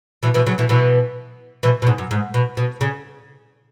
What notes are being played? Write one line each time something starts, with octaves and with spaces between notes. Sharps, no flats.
B2 E3
B2 E3
C#3 F#3
B2 E3
B2 E3
B2 E3
B2
G#2
F#2
G#2
B2
B2
C#3